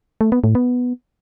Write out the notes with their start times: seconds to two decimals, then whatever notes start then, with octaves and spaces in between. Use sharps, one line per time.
0.21 A3
0.32 B3
0.44 A2
0.55 B3